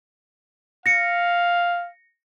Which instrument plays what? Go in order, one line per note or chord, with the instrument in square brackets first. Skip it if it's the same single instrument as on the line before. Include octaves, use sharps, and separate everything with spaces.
[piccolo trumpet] F5 [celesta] A#6 C#7